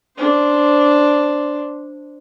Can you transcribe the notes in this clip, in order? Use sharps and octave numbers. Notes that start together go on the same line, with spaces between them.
D4 C5